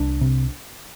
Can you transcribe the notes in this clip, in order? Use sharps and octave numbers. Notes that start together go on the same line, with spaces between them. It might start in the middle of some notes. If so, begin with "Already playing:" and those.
Already playing: C2 D4
C3